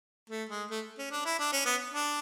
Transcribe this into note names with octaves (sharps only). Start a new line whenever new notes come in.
A3
G#3
A3
C#4
D4
E4
D4
C#4
B3
D4